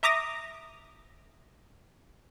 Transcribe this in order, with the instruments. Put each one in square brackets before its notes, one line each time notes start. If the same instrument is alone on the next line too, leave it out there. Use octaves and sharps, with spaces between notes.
[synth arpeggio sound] E5 A#5 D6 D#6 A#6